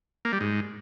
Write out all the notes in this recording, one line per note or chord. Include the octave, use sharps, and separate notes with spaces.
A#3
G3
G#2